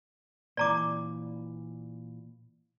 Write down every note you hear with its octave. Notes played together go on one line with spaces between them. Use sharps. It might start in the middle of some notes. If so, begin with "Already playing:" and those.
A#2 E3 D5 A#5 D6